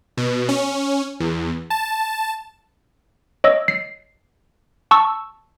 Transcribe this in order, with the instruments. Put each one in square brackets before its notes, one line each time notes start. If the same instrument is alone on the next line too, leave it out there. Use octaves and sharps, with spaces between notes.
[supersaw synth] B2
C#4
E2
A5
[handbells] C#5 D#5 E6
C7
A5 C#6 E6